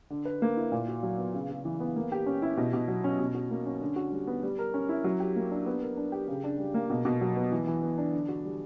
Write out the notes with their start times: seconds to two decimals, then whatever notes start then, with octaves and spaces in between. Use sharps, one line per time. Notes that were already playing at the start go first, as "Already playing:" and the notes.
0.10 D3
0.25 B4
0.42 A#3
0.57 E4
0.72 A#2
0.88 F#4
1.03 F#3
1.18 B3
1.34 C#3
1.49 C#3
1.65 E3
1.80 B3
1.96 A#3
2.12 G4
2.26 C#4
2.42 E4
2.57 B2
2.73 B2
2.88 F#3
3.04 C#4
3.19 B2
3.34 F#4
3.51 A#3
3.66 C#4
3.81 D3
3.96 F#4
4.12 G3
4.27 B3
4.43 G3
4.59 A#4
4.74 C#4
4.89 E4
5.04 F#3
5.20 G4
5.36 A#3
5.51 D4
5.66 B3
5.82 A#4
5.97 D4
6.12 G4
6.28 C#3
6.44 D4
6.59 G3
6.74 A#3
6.90 B2
7.05 B2
7.21 F#3
7.36 B3
7.52 E3
7.67 E3
7.83 B3
7.98 D4
8.13 D3
8.29 F#4
8.45 G3